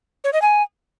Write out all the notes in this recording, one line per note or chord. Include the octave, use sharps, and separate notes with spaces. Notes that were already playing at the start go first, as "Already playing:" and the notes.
C#5
D#5
G#5